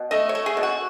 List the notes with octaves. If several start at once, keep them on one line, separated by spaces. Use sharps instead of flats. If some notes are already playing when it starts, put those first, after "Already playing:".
Already playing: B2
A3 D#5
C#5
A3
G#4
B2
F#4